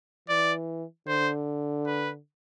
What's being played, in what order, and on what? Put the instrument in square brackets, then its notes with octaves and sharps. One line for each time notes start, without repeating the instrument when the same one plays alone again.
[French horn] E3 [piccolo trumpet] D5
[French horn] D3 [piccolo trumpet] C5
[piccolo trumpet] B4